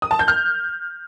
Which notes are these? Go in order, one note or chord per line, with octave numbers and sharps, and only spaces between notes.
D#6
A5
G6
F6